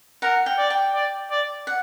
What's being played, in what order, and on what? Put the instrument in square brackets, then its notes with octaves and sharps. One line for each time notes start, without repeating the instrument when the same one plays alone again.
[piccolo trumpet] A#4 [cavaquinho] F#5
[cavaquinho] G5
[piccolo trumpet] D5
[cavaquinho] G5
[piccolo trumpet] D5
D5
[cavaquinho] F#5